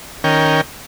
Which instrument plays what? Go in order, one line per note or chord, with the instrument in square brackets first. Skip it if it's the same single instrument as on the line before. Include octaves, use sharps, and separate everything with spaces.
[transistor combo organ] D#3 C#4 A#4 G5